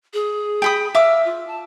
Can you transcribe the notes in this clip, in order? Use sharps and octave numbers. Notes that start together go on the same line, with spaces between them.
G#4
G5 B5 D#6
E5 F5 D6 E6
F4
A5